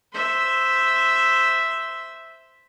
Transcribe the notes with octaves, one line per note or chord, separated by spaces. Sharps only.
C5 E5